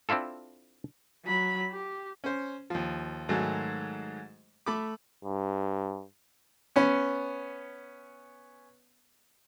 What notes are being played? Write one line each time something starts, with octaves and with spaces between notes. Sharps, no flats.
C4 D4 E4 F4 A4
F#3 B5
G4
C#4 C5
D#2 F3
G#2 D#3 F#3 G#3 A3
A3 B5 D6
G2
B3 C#4